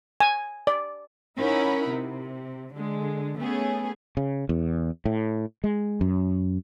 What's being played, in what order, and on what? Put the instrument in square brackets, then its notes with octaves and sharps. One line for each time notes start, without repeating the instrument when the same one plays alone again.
[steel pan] G#5
D5
[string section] C#4 D#4 E4 A#4 F#5 B5
C3
D3 G#3
A3 B3 C#4 G#4
[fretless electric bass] C#3
E2
A2
G#3
F#2